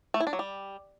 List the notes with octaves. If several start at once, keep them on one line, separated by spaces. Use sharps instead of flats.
A3
E4
D4
F#3
G3